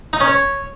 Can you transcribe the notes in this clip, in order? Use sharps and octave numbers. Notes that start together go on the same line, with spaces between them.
D#4
C#4
C#5